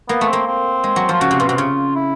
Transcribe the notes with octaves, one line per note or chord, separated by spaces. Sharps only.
A#3 B3
A3
A#3 C4
C4
G#3
F#3
F3 F4
C#3 F#4
C3
B2 F4
C3 F#4
C#3 F4
E4